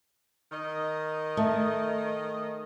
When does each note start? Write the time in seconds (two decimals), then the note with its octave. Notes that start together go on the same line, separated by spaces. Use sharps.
0.52 D#3 D#5
1.37 A3